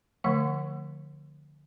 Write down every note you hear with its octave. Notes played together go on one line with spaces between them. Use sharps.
D3 F3 A3 F#5